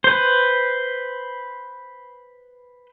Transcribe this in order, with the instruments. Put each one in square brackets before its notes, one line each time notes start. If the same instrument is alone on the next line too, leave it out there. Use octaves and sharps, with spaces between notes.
[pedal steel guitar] B4 C5